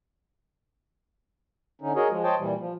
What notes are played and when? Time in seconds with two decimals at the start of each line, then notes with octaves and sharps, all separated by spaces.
1.81 D3 C#4 D#4
1.96 F#4 G#4 A#4 C#5 D#5
2.10 F3 G#3
2.24 C5 C#5 D#5 G5 A5
2.39 A#2 E3 G3
2.59 F3